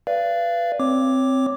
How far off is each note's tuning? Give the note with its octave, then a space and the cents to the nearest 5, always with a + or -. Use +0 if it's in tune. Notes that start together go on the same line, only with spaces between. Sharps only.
B4 +0 D5 +0 F5 -30
C4 +0 C#5 +10 D6 +0